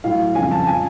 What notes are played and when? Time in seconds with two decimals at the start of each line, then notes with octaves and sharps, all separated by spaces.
0.04 A2 F#3 F5
0.35 F2 C#3 F3 G#5
0.51 A5
0.67 F3 G#5